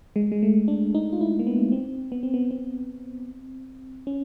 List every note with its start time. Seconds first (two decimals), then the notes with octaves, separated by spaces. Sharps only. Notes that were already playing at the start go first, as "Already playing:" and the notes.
0.16 G#3
0.32 G#3
0.43 A3
0.68 D4
0.95 D#4
1.13 F4
1.21 E4
1.39 A#3
1.47 B3
1.72 C4
2.12 B3
2.23 C4
2.34 B3
2.51 C4
4.07 C#4